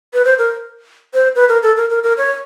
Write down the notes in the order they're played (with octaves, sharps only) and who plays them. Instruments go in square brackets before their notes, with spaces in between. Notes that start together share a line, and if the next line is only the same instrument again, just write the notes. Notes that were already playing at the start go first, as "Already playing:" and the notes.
[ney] B4
C5
A#4
C5
B4
A#4
A4
A#4
A#4
A#4
C#5